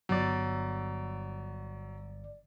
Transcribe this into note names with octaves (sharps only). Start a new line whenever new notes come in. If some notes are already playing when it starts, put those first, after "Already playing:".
G1 F#3 D5